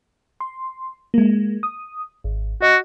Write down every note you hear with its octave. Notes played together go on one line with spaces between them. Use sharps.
C6
G#3 A#3
D#6
G#1
F#4 D#5